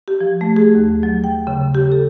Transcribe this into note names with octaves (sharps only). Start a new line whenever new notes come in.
G4
F3
A3
G#4
D#2
F#3
G5
C#3
G4
A4